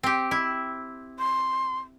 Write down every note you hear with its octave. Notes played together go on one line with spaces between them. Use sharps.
C4 G4
E4
C6